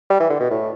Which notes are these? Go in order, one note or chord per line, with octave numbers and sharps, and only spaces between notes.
G3
E3
D3
B2
A2